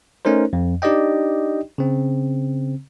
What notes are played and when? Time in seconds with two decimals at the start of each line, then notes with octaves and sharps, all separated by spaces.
0.25 A3 C#4 D#4 A#4 C5
0.53 F2
0.82 D4 D#4 G4 D5 D#5 G5
1.78 C#3 C4